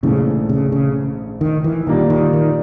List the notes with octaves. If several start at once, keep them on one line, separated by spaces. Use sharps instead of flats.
A#1 G#2 C#3 E3 A3
C#3
C#3
D#3
E3
A#2 D#3 G3 A#3 D4
D#3
D#3